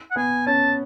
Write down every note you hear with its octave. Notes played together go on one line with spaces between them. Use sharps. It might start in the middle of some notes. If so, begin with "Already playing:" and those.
F#5
B3 G#5
C#4 A5